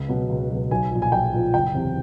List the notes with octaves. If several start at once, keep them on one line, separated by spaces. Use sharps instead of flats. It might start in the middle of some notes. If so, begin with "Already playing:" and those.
Already playing: C#2
B2 F#3
C#2
B2 F#3
B1 G#5
A#2 F3
G#5
B1 G5
A#2 F3
F#1 G5
E2 C3